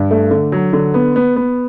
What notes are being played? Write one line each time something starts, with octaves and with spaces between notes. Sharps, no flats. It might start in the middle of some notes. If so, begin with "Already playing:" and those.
Already playing: G2
A3
D3
F#3
D3
B3
B3
B3